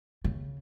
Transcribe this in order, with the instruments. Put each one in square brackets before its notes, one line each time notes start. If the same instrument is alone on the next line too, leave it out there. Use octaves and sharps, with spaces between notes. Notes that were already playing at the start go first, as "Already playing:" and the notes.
[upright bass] C#3